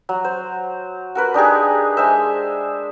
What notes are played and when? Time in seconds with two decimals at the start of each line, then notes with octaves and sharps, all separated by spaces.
0.09 F#3
0.25 C5
1.15 F#4 A#4 B4
1.34 D4 D#4 G4 G#4
1.97 G#3 C5 E5